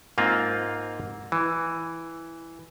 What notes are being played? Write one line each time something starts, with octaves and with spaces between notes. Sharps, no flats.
G#2 A#3 C4 F4
E3